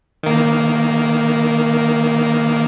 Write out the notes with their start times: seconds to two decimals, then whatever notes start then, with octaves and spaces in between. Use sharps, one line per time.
0.23 D#3 A#3